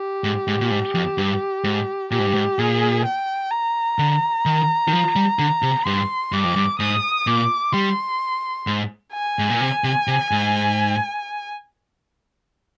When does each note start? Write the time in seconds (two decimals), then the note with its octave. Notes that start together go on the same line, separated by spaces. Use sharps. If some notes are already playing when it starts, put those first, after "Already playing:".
Already playing: G4
0.24 G#2
0.47 G#2
0.61 A#2
0.71 G#2
0.95 F2
1.18 G2
1.64 G#2
2.11 A#2 G4
2.19 G#2
2.27 G2
2.34 G#2
2.58 A#2 G#4
3.05 G5
3.51 A#5
3.99 D3
4.46 D#3
4.88 D#3
4.93 F3
5.16 G3
5.39 D3
5.62 C3
5.85 G2 C6
6.32 G2 D6
6.44 F2
6.56 G2
6.79 G#2 D#6
7.27 A#2 D6
7.73 G3 C6
8.67 G#2
9.14 G#5
9.39 G#2
9.50 A#2
9.61 C3
9.84 C3
10.07 C3
10.31 G#2